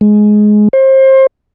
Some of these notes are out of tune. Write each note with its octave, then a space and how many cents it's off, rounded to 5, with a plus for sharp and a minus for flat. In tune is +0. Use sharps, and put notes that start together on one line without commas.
G#3 +15
C5 +30